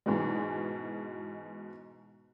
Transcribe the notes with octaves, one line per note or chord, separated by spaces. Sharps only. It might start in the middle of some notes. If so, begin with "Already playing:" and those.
G#2 B2 E3 G#3